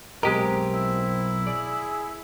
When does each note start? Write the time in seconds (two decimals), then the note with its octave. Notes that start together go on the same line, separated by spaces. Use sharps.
0.23 B1 G2 G#3 C4 G4 A#4 D#5
0.74 E4
1.47 G#4 D5